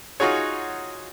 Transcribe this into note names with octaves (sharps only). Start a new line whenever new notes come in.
D#4 F4 F#4 G#4 C#5